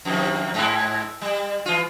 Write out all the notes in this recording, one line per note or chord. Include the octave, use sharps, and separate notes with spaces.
F2 C3 D#3
G#2 G#3 E4
G3
E3 F4